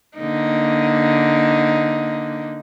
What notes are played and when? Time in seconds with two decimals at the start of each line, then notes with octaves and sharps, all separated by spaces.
0.18 D3 A#3 D#4